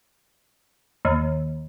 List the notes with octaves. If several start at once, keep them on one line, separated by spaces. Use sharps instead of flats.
D#2